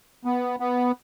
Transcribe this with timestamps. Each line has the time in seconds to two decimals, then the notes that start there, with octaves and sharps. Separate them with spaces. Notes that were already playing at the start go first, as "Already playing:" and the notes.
0.25 B3
0.60 B3